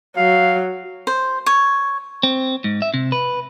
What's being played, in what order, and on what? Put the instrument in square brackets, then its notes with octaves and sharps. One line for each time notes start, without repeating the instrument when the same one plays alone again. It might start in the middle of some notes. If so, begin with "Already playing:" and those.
[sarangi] F#3 [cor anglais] F5
[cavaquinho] C5
C#5
[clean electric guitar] C4
G#2
E5
C3
B4